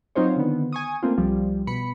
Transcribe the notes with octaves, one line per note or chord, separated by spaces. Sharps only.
F#3 C4 D#4 F4 C5 C#5
D3 D#3 B3
G#5 C#6 D#6
A3 A#3 C4 F4
C2 F3 G3
B2 B5 C#7